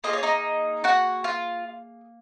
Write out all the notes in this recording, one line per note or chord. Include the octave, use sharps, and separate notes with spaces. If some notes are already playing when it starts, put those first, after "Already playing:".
A#3 F4 G#4 D#5
C#5
D#4 D#5
F#4 F#5
F4 F5